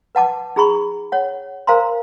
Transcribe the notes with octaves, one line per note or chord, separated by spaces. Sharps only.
B4 F#5 A5 D6
D#4 G#4 A#5 B5 C#6
C#5 F#5
A#4 C5 F5 G#5 A#5 C6